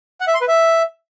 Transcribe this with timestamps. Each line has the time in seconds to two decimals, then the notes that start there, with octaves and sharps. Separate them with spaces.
0.21 F#5
0.27 E5
0.34 C6
0.41 B4
0.48 E5